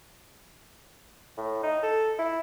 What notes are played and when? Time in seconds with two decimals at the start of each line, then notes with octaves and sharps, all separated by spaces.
1.38 A2
1.63 D#4
1.83 A4
2.19 E4